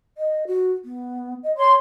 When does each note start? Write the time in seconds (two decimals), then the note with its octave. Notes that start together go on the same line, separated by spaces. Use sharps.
0.18 D#5
0.47 F#4
0.85 B3
1.43 D#5
1.57 C#5 C6